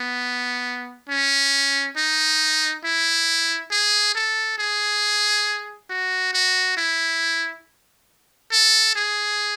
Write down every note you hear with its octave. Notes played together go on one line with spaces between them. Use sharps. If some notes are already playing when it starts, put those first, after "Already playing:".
Already playing: B3
C#4
D#4
E4
G#4
A4
G#4
F#4
F#4
E4
A4
G#4